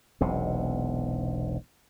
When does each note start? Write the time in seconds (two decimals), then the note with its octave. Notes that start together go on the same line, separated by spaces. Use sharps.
0.21 E1 B1 C3